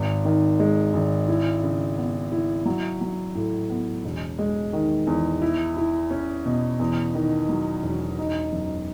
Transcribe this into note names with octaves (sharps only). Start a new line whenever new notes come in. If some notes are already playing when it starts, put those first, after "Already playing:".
Already playing: G#1
D#3
G#3
G#1
E4
C#3
B3
E4
F#3
F#3
A2
B3
E1
G#3
D#3
E2
E4
E4
C#4
B2
E2
D#3
F#3
E1
D#4
F#2